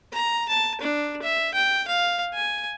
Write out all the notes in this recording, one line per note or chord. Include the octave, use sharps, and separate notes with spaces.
A#5
A5
D4
E5
G5
F5
G#5